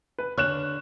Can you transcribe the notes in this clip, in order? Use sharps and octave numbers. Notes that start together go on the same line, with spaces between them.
B4
D3 C#5 F6 F#6 E7